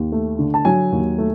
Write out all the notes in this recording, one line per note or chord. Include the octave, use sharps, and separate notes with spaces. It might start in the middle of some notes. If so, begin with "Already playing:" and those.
Already playing: D#2
A3
D3
A5
F#3 G#5
D#2
A3